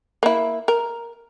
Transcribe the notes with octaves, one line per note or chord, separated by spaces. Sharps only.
A#3 E4
A#4